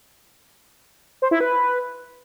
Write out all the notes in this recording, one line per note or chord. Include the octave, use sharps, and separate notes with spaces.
C5
E4
B4